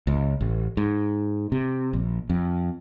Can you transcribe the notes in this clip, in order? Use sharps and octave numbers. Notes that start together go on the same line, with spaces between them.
C#2
A1
G#2
C3
A#1
F2